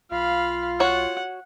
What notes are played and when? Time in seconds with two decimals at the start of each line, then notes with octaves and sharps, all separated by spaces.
0.11 B1 F4 F5 B5
0.80 F#4 C#5 F#5